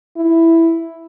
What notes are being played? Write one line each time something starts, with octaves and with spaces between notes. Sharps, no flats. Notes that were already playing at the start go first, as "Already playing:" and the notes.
E4